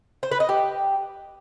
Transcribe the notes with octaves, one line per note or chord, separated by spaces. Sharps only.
C5
B4
D#5
G4